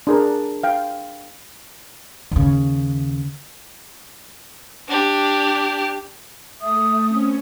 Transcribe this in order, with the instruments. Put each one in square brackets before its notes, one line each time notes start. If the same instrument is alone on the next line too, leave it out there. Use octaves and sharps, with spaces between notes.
[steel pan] D4 G#4 A#4
F5 G5
[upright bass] D#2 C#3
[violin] D4 G4
[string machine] A3 [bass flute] E5 [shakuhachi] D#6
[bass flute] C4 [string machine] C#4